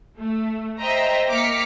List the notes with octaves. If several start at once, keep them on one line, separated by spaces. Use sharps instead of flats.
A3
C5 D#5 E5 G5 A#5
A#3 D6 F6 B6 C#7